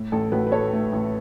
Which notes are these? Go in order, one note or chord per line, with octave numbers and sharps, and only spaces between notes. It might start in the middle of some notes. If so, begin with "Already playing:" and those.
Already playing: A2
A1 A4
A1 F#4 B4
B4
A2 A4 C#5
A3
A1